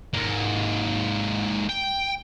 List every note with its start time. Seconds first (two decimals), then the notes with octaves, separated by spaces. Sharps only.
0.14 G#2 A#3
1.69 G5